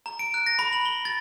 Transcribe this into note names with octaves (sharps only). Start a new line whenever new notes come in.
A#5
D7
F#6
A#6
B5
F#7
G7
A6